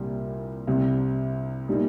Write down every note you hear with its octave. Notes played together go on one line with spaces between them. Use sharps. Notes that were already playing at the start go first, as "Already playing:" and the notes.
Already playing: C2 A#2 G3
C2 C3 G3
A#2 G3 D#4